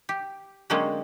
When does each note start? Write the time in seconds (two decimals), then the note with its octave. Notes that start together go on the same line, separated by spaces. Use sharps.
0.09 G4
0.70 D3 F#3 G#3 A#3 C4 C#4